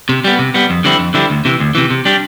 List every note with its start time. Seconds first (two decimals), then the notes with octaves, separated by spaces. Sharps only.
0.09 C3
0.24 G3 B3
0.39 C3
0.54 G3 B3
0.70 F2
0.84 D3 G3 C4 E4
0.99 F2
1.14 D3 G3 C4 E4
1.30 D2
1.45 C3 E3
1.60 D2
1.75 C3 E3
1.90 C3
2.05 G3 D4